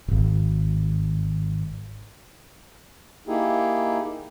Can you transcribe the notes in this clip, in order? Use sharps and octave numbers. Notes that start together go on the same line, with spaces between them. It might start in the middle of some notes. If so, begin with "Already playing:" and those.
D#1 G#1
A#3 D#4 E4 G4 G#4